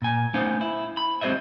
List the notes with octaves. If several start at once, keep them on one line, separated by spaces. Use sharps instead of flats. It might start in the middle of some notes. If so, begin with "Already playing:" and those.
A#2 G#5
A3 B3 C#4 D#4 C5 F5
E4
B5
G#3 C4 G4 C5 D#5 E5